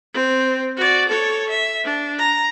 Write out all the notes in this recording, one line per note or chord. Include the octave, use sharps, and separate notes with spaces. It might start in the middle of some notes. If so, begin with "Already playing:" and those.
C4
F#4 D5
A4 C#5
E5
D4
A#5